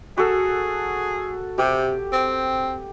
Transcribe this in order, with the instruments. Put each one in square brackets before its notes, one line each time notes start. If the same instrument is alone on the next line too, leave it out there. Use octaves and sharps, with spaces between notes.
[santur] F#4 A4 [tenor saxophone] G#4
[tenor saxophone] C3 [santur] G4
[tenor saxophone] C4